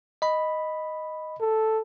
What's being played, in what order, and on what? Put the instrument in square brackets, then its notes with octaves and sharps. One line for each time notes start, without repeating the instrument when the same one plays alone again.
[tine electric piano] D#5 B5
[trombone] A4